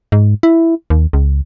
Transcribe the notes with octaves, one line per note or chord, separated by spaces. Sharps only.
G#2
E4
D#2
C#2